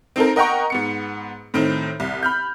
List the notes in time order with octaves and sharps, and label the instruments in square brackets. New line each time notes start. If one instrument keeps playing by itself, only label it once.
[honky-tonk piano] C4 D#4 A4 A#4
A#4 D#5 F#5 G5 A#5 C#6
G#2 B3 C#7
A2 D#3 C4 D#4
C2
B5 F6 G6